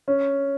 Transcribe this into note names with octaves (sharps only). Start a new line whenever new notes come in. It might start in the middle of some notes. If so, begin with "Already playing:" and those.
C#4